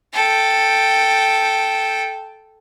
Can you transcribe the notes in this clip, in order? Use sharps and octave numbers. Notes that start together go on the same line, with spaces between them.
A4 G5